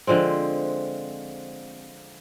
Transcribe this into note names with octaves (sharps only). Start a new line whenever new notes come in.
D3 F3 G#3 C4